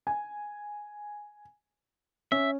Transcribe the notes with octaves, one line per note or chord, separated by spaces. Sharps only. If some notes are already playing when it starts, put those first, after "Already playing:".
G#5
C#4 E5